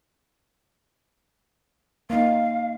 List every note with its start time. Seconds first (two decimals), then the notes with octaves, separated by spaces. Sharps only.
2.10 A#3 D#4 F5